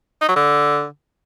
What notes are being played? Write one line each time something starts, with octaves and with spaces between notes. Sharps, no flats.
D#4
F#3
D3